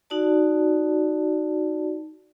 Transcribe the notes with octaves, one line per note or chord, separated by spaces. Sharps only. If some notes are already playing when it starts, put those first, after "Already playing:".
D#4 F#4 D5 A5